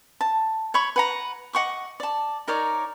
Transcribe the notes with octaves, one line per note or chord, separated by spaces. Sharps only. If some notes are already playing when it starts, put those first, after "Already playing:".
A5
C#5 B5 C#6
B4 F#5 A#5
D#5 F#5 C#6 D6
D5 A5
D#4 A#4 C#5 D5